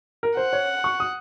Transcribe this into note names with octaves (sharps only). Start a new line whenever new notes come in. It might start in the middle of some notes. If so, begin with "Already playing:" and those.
A#4
C5 F#5
C#5
C#6
D#6